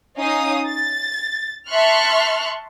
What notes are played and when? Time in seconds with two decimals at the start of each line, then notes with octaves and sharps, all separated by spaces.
0.19 C#4 D#4 F5 D#6
0.66 A6
1.70 E5 A5 C6 C#6 F6 F#6